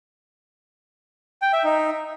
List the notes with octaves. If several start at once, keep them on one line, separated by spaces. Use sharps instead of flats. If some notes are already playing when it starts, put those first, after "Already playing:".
G5
E5
D#4